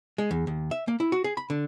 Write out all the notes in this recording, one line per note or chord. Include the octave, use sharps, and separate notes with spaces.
G#3
E2
D#2
E5
A#3
E4
F#4
G#4
B5
D3